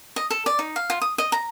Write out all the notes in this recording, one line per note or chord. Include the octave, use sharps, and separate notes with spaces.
D#5
A4
D5
D#4
F5
F4
D#6
D#5
A#5